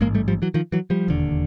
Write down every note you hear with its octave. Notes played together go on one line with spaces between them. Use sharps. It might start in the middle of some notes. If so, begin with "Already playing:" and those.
A1 G#2 G#3 A#3
G3 A3
F3 G3
E3 F#3
D#3 F3
E3 F#3
F3 G3
E1 D#2 D3